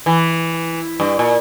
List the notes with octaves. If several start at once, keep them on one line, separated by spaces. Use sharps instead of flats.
E3
G2
A#2